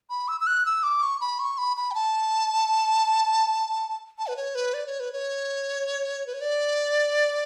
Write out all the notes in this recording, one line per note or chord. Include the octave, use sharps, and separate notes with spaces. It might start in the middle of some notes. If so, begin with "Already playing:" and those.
B5
E6
E6
F#6
E6
D6
C#6
B5
C#6
B5
B5
G5
A5
A5
B4
C#5
B4
D5
C#5
B4
C#5
B4
C#5
D5